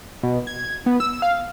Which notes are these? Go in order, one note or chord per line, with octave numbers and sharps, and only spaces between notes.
B2
G#6
B3
E6
F5